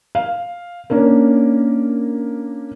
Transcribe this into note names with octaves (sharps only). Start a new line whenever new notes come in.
F5
A#3 C#4 D4 A#4